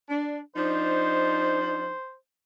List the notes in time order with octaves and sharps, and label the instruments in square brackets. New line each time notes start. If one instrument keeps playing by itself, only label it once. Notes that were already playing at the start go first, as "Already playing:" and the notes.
[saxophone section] D4
[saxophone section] F3 D4 D#4 [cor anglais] C5